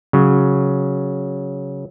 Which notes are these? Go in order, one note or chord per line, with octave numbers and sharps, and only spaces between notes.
C#3 F#3